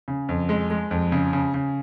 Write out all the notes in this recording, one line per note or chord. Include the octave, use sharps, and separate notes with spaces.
C#3
F2
G#3
G#3
F2
C#3
C#3
C#3